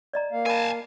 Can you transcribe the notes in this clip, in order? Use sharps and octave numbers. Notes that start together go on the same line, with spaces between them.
D5 D#5 A#5
A#3 F5
A#4 D#5 G#5 A5 B5